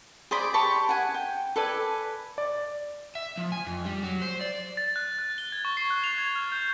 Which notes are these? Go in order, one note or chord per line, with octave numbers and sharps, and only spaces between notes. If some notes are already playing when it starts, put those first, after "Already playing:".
G#4 C5 D5 B5
G4 A5 B5 C#6
F#5 G#5
G5
A4 B4 D5 G#5
D5
E5
F3
G#5
F2
G3
F#3
C5
D5
A6
F#6
F#6
G7
G#6
C#6
C7
F#6
F7
G#6
F6
G6